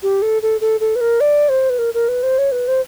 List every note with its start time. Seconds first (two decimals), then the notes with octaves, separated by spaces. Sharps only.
0.03 G4
0.22 A4
0.42 A4
0.61 A4
0.80 A4
0.96 B4
1.01 A#4
1.20 D5
1.49 C5
1.70 B4
1.79 A#4
1.94 A#4
2.08 B4
2.23 C5
2.38 C#5
2.52 B4
2.68 C5